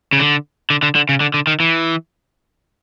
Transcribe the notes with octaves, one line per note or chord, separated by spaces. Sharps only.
C#3
D3
D3
D3
D3
C#3
D3
D3
D#3
E3